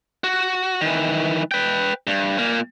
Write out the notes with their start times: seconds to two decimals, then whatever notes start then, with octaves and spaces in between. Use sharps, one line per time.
0.24 F#4
0.81 D#3 E3
1.51 B4 G5
2.07 G2
2.38 A#2 A#3